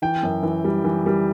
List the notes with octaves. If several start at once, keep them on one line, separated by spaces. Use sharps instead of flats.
E3 G5
F#2
E3
G3
E3
G3